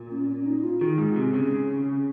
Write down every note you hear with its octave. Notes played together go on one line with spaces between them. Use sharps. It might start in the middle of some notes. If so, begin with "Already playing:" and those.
Already playing: A#2
C#4
C#4
D#4
F4
D#3 G#4
G#2
C3
C#3